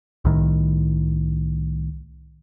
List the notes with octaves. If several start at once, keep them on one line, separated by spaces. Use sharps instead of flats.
C2 A2 D#3